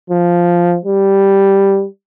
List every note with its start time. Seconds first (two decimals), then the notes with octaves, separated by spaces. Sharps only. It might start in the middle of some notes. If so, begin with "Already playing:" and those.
0.10 F3
0.85 G3